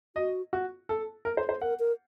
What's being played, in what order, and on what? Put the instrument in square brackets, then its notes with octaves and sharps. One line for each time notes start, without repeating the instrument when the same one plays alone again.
[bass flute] F#4 [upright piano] D#5
[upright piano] F#4
A4
A#4
C5
C5
[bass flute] A#4 [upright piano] F#5
[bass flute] A#4